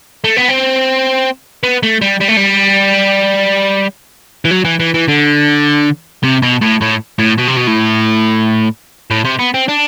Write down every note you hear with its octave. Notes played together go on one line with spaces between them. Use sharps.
A3
B3
C4
B3
A3
G3
G3
A3
G3
E3
F#3
E3
E3
E3
D3
C3
B2
A2
A2
A2
B2
C3
B2
A2
A2
C3
B3
C4
D4